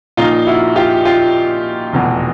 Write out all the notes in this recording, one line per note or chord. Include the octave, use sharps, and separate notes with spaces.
A#1 A#2 D#4 F4
E4 F#4
F4 G4
F4 G4
F1 E2 B2